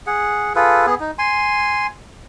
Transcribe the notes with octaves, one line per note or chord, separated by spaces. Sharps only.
G#4 F#5
F4 G#4 A4 B4
B3 G#4
D#4
G#5 C6